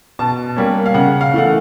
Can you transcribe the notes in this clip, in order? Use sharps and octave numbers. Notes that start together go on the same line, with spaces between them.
B2 A5
G3 A#3 C#4
F5
C#3 F#5
F5
E3 A3 F#5